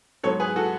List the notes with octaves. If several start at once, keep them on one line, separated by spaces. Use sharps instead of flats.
G#2 F#3 B3 A4 C#5
G#4 B4
F#4 A4